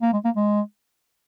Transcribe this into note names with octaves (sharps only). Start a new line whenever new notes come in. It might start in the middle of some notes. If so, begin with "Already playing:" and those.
A#3
G#3
A#3
G#3